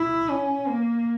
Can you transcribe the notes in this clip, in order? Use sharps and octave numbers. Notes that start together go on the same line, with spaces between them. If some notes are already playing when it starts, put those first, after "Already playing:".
Already playing: E4
C#4
A#3